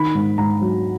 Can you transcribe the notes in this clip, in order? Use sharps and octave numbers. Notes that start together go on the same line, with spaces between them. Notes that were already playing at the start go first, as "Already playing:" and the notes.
Already playing: D#3 B5
G#2
G#2 A#5
F#3